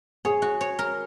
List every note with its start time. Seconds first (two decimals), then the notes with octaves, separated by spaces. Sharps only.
0.25 G#4 C#5
0.42 F#4
0.61 C#5
0.79 A#4